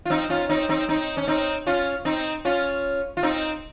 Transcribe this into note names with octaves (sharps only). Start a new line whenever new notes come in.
F4
C4 D#4
C#4 F4
C4 D#4
C4 D#4
C4 D#4
C#4
C4 D#4
C#4 F4
C4 D#4
C#4 F4
F4
C4 D#4